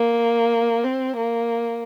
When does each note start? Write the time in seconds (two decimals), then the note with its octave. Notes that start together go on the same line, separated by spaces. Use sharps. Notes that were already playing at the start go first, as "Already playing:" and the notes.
Already playing: A#3
0.84 C4
1.16 A#3